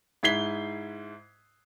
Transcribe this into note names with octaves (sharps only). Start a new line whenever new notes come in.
G#2 E4 G#6 B6 C7 G7